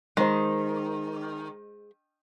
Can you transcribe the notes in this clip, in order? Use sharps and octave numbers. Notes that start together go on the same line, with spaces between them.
D#3 G#3 C5